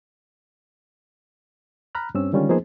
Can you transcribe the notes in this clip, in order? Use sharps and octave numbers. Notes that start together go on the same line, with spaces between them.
A#5 B5 F6 F#6
G2 C4 C#4 E6
D3 D#3 G3 G#3 C#4 F4
F3 A#3 B3 D#4 G#4 C5